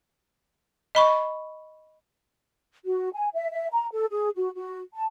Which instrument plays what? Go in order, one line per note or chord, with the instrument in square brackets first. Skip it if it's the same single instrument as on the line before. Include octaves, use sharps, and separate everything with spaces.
[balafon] D#5 B5 C#6
[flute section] F#4
G#5
E5
E5
A#5
A4
G#4
F#4
F#4
A5